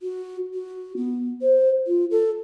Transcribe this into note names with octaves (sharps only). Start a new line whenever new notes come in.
F#4
F#4
B3
C5
F4
A4